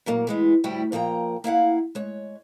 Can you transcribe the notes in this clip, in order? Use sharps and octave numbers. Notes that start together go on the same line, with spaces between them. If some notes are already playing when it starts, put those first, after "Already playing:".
A#2 F#3 A#3
E3 G#3 B3
D2 A2 G3 E4 F#4 G5
A#2 F3 A#3 G5 A#5
A#3 E4 F5 F#5
G#3 C#5